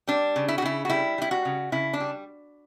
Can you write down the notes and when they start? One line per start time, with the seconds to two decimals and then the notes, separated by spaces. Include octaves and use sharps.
0.07 G3 D4
0.36 C#3
0.48 E4
0.58 F#4
0.62 C#3 E4
0.85 F#4
0.90 G3 E4
1.18 G3 E4
1.31 F#4
1.45 C#3
1.72 C#3 E4
1.93 D4
2.00 G3